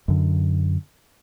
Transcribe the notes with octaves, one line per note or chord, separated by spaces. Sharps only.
F#2 D3